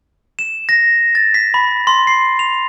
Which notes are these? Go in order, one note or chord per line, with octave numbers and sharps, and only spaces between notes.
E7
A#6
A6
B6
B5
C6
C7
F7